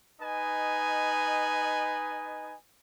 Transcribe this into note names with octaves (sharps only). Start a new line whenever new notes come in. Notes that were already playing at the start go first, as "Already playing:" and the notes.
D#4 B4 D#5 G#5